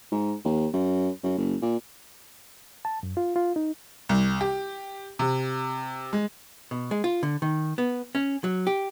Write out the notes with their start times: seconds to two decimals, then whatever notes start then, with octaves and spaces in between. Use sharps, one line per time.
0.12 G#2
0.45 D#2
0.74 F#2
1.24 F#2
1.38 F#1
1.62 A#2
2.85 A5
3.03 F#2
3.17 F4
3.36 F4
3.56 D#4
4.09 C2
4.41 G4
5.19 C3
6.13 G#3
6.71 B2
6.91 G#3
7.04 F4
7.23 D3
7.42 D#3
7.78 B3
8.15 C#4
8.44 F#3
8.67 G4